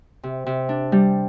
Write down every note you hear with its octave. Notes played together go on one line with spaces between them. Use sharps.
C3
C3
D4
G3